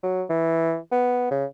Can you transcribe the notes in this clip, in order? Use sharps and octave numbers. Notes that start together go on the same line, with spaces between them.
F#3
E3
B3
C#3